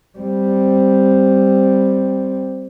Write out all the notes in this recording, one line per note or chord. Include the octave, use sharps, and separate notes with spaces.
G3 C4